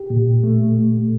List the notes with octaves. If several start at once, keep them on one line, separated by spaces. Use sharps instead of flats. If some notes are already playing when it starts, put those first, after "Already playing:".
Already playing: G4
A#2
A3